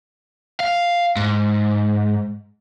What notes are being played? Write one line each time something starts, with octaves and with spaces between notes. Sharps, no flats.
F5
G#2